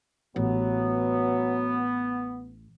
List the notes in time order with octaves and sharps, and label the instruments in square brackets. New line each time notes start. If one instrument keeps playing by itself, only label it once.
[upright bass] A1 [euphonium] F#3 [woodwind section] B3